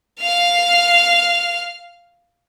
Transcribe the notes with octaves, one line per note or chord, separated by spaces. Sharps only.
F5 F6